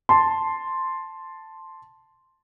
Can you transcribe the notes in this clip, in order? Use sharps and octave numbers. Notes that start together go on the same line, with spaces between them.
A5 C6